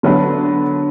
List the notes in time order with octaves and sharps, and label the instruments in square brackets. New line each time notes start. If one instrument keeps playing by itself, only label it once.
[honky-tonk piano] D3 F#3 B3 D4